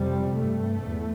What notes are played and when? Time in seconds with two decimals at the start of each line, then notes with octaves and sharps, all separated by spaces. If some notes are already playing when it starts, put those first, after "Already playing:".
Already playing: F2 C3 G3
0.35 G2 A3
0.83 E2